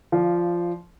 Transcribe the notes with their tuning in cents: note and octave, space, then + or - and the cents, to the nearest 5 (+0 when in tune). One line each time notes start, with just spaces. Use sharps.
F3 -10 D5 +0 F5 +0